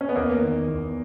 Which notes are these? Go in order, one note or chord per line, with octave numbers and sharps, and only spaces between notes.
C#4
B3
E2 A#3
D#3
E2